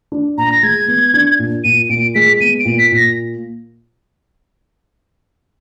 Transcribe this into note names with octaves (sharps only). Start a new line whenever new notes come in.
D4
A#2 A#5
A#6
G#3 G#6
B3
D4
A#2
A#2 D#7
A#2 D7
G#3 B6
B3 D#7
D7
A#2
B6
A#2
A#6